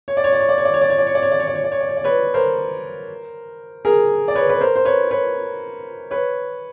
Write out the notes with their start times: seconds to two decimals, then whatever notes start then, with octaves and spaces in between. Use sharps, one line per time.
0.08 C#5
0.17 D5
0.24 C#5
0.33 D5
0.40 C#5
0.49 D5
0.58 C#5
0.65 D5
0.74 C#5
0.81 D5
0.90 C#5
0.98 D5
1.07 C#5
1.15 D5
1.22 C#5
1.32 D5
1.40 C#5
1.47 D5
1.55 C#5
1.64 D5
1.72 C#5
1.81 D5
1.89 C#5
1.97 D5
2.04 B4 C#5
2.34 A#4 C5
3.85 G#4 A#4
4.28 D5
4.35 B4 C#5
4.49 B4
4.61 A#4 C5
4.76 C5
4.85 B4 C#5
5.11 B4 C#5
6.11 B4 C#5